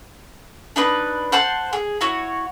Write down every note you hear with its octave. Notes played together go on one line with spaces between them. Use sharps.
D4 D#4 B4
C5 F#5 A5 C6
G#4
E4 F#4 C#5